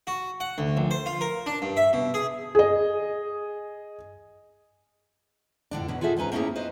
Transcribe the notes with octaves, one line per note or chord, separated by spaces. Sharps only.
F#4
F#5
D2
A#1
C5
F4
A#4
D4
G2
E5
B2
G#4
G#4 D#5
F2 A2 D3 D4
B2 F#3 B4
F4 F#4 G#4 A4 C5 E5
D#2 G#2 C#4 B4 A#5
A3 A#3 C#4 E4 G4 G#4
B4 C5 D#5